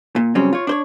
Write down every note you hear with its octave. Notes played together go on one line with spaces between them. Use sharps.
A#2
C#3 F#3 G3 C4 C#4
F4 C#5
D4 C5 C#5